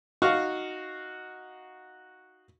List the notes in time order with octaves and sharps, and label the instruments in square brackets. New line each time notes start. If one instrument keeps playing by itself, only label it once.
[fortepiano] D#4 F#4 F5 C#6